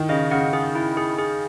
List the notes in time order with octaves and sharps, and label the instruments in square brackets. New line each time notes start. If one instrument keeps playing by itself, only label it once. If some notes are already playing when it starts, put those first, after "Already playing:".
Already playing: [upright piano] D#3
[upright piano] C#3 [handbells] D#5
[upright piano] C#3 [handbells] F#5
[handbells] G#4
E4
G#4
G#4